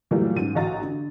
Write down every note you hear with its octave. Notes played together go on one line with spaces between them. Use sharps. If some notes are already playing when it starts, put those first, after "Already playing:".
A#2 E3 F#3 G3 A3 A#3
G#2 D#3 C#4 D#7
A1 F#4 D#5 F5 A#5 A6
D3